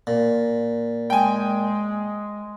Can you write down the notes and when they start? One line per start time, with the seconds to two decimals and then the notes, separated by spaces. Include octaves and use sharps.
0.07 A#2
1.10 G#3 G5 G#5